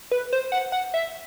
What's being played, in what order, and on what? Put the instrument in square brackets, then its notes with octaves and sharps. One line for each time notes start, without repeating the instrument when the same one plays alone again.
[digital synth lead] B4
C5
F#5
F#5
E5